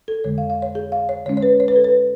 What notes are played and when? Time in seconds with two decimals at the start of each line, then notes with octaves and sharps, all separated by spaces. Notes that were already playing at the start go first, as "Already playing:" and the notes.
0.08 A4
0.24 F2 D3 G#3 C#5
0.38 F5
0.50 F5
0.62 C#5
0.75 G#4
0.92 F5
1.09 C#5
1.26 D3 G#3 C#4 C#5
1.37 C#5
1.43 B4
1.60 C#5
1.68 B4
1.76 A4
1.84 B4